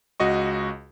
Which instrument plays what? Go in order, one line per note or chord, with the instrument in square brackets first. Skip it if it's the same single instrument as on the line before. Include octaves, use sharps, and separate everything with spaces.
[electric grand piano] C#2 F#4 D#5 C#6